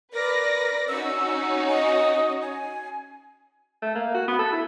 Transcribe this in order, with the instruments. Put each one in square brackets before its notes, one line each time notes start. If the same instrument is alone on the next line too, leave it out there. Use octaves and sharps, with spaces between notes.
[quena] A#4 [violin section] B4 D5 A#6
[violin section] C#4 D#4 F#4 [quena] E6
[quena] D#5
G#5
[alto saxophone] A3
A#3
F#4
B3
A4
E4